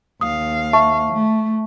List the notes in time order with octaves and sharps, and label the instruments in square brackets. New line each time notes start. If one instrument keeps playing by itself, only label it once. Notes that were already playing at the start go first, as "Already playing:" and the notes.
[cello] D#2 F5 [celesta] D#6
[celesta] E5 A5 C#6
[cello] A3